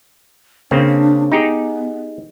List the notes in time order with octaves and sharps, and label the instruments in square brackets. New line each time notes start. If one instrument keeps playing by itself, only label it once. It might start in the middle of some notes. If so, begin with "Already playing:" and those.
[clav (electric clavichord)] C#3 A#3 C4 [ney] D4
[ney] B3 [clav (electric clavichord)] D#4 G4 G#4